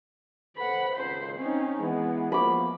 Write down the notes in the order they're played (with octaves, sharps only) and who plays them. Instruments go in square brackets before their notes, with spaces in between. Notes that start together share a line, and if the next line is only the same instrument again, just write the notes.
[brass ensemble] A4 B4 C5 [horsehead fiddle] F#5 B5
[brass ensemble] G#1 C#2 [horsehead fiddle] C5
[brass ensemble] C4 [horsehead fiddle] C#4 D#4
[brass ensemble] E3 B3 [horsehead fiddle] G#3
[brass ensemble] F3 A#3 B3 [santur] B5 D6